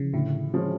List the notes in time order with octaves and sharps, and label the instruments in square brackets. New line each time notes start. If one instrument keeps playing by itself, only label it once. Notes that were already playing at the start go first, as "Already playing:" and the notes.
Already playing: [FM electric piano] C#3 E3 F3
[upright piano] A2 [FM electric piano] D3
[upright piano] F3 G#3 C#4